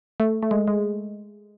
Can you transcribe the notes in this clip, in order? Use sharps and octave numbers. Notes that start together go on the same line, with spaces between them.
A3
A3
G#3
G#3